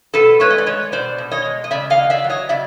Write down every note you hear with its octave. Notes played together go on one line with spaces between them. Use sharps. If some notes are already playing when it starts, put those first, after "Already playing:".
B2 A4 B4
G#3 B4 C#5
D#5
D5
G#3 B4 C#5
B2 C5 D5
B2
C#5 D#5
G#3
D#5
C#3 D5 E5
D#5 F5
F#3
D5 E5
F#3
C#5 D#5
C#3 D5 E5